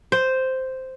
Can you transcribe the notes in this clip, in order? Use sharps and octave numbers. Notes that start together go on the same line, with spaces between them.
C5